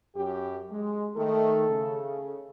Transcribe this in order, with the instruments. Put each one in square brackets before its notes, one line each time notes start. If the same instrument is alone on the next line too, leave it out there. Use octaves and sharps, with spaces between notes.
[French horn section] F#2 G4
G#3
[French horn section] D#3 A3 [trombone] A4
[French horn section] C#3